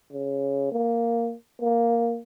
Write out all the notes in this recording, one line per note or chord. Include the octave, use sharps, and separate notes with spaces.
C#3
A#3
A#3